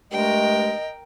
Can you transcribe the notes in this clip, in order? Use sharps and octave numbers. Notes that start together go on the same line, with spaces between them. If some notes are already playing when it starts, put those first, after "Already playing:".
G2 G#3 A3 A#4 D#5 G5